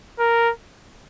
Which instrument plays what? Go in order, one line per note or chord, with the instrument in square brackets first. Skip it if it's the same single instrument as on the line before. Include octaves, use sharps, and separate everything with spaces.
[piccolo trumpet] A#4